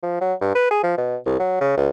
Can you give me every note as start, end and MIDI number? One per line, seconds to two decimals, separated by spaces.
0.03 0.17 53
0.21 0.34 54
0.41 0.54 43
0.55 0.69 71
0.71 0.79 68
0.83 0.97 53
0.97 1.17 47
1.26 1.36 36
1.39 1.58 54
1.61 1.75 49
1.77 1.90 37